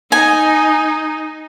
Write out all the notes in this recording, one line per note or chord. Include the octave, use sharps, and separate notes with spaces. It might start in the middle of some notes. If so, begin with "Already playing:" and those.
D#4 G#5